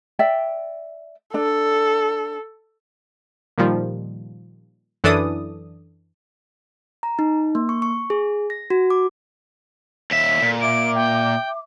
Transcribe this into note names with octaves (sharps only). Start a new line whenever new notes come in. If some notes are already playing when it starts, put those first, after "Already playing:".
D5 E5 G5
D4 A4
A#2 D#3 F3 G3
F#2 E3 D4 A4 D5 D#6
A#5
D#4
A#3
C#6
C#6
G#4
A#6
F#4
D6
D#2 E5 B6
A#2 A4
E5 D6 D7
G5